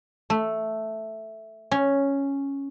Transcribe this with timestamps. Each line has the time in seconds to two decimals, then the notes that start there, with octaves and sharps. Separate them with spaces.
0.30 A3
1.71 C#4